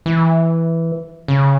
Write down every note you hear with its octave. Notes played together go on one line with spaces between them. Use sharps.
E3
C#3